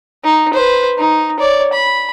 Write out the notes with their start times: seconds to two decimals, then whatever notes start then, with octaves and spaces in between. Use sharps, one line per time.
0.24 D#4
0.53 B4 C5
0.98 D#4
1.39 C#5 D5
1.73 B5